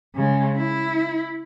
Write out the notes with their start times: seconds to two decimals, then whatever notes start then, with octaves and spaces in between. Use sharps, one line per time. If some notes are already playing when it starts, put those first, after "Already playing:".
0.15 C#3 G#3
0.57 E4